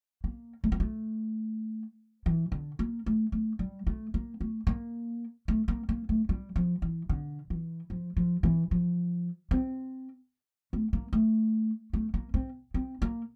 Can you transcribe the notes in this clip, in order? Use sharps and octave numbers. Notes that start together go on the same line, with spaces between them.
A#3
A3
A#3
A3
E3
D3
A#3
A3
A3
G3
A3
A#3
A3
A#3
A3
A#3
A#3
A3
G3
F3
E3
D3
E3
F3
F3
E3
F3
C4
A3
A#3
A3
A3
A#3
C4
C4
A#3